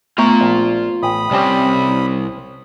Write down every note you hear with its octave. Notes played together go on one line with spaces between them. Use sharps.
A3 B3 F4 A#5 C#6
A#1
A1 G5 B5 D#6
C2 G3 C4 C#4 G4